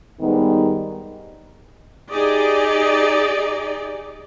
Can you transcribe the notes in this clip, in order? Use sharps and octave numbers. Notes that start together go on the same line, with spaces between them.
G#2 D#3 G3 B3
D#4 G4 G#4 D5 D#5